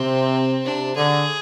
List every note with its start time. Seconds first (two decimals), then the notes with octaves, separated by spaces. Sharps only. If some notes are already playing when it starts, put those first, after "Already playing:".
Already playing: C3 C4
0.65 C3 D4
0.96 D3 G#4